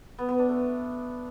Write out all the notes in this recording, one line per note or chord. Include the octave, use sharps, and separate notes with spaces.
B3
B3
D4
A3